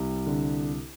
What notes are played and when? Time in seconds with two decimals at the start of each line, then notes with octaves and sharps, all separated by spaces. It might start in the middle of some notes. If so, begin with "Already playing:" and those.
Already playing: C2 G3
0.26 D3